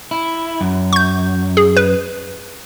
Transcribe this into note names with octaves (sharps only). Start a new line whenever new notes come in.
E4
F#2
C#6 G6
G#4
B4